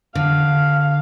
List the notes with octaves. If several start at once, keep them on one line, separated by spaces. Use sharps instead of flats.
D3 F5